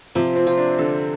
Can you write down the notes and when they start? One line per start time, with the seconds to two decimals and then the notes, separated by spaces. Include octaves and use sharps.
0.15 C3 F3
0.36 C4
0.47 F4
0.58 D4
0.79 D3 A4